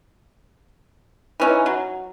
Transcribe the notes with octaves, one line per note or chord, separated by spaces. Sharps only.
E3 C#4 D#4
F#3